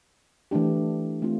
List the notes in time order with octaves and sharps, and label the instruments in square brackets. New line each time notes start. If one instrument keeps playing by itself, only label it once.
[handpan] E3 A3 D4 G4
A3 C4 F4